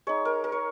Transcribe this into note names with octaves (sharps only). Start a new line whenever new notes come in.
G#3 D#4 C#5
A#4
A#4
C#5